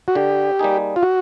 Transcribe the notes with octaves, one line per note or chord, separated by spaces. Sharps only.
F#4
D3 G4
G3 A#3 D#4 G#4
F4
F#4